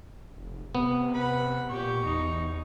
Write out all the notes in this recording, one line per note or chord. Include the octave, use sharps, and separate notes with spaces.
F1
C3 B3
B4 F#5 B5
A#2 G4 C#6
E2 D#4